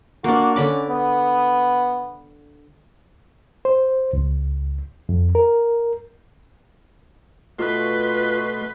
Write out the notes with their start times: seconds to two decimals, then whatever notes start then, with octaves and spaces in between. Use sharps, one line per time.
0.24 A#3 D4 F#4
0.56 D3 C#4 B5 D6
0.89 B3
3.65 C5
4.13 C#2
5.09 F2
5.35 A#4
7.59 B2 A3 F4 B4 C6